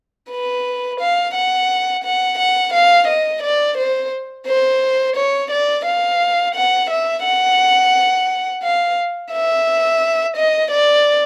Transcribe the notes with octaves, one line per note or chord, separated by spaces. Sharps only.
B4
F5
F#5
F#5
F#5
F5
D#5
D5
C5
C5
C#5
D5
F5
F#5
E5
F#5
F5
E5
D#5
D5